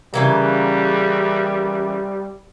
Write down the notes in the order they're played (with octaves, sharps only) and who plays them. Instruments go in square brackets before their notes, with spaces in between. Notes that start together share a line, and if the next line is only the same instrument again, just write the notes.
[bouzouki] C#3 E3 A#3 [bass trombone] G3